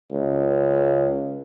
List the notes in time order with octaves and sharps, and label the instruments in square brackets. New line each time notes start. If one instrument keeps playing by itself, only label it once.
[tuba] C#2